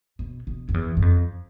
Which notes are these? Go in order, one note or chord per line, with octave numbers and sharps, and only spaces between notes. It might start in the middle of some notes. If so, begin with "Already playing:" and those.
B2
B2
F2
E2
G2
F2